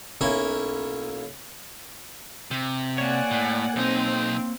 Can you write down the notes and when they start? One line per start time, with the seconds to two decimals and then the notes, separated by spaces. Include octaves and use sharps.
0.21 B1 A#3 C#4 E4
2.51 C3
2.98 A#3 C#5 D5 F#5 G#5
3.31 A2
3.76 B1 C4 D#4